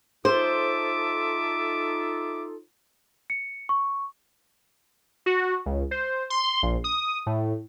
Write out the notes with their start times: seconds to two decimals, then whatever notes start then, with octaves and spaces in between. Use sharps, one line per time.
0.25 D#4 F4 A4 C5 E5 D6
3.30 C#7
3.69 C#6
5.26 F#4
5.66 C#2
5.91 C5
6.30 C6
6.63 A#1
6.84 D#6
7.26 A2